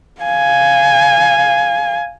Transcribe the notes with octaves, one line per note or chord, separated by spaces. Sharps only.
F5 G#5